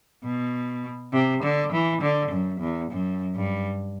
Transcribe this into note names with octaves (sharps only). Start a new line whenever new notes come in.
B2
C3
D3
E3
D3
F#2
E2
F#2
G2